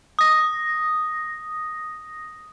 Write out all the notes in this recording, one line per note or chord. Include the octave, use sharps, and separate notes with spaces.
D#6 A#6